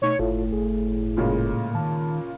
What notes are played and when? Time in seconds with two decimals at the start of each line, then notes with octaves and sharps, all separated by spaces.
0.02 B2 A3 D#4 C#5
0.19 G1 A2 F4 A4 C#5
0.52 G1 G#4
1.17 A#2 C#3 G#3
1.75 D#3 A5